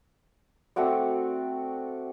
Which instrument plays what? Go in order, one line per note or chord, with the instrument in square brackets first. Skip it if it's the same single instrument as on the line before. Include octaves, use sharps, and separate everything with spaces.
[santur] A3 C4 F#4 D5